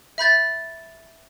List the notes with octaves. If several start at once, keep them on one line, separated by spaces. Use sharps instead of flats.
E5 B5 G6 A6